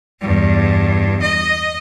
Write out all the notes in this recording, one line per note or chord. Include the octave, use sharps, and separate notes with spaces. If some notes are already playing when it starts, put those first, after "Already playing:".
E2 G2
D#5